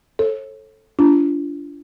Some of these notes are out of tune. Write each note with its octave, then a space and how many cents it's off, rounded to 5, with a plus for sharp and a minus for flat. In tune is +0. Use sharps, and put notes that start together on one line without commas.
A4 +0 C#5 -45
D4 -30 F4 -40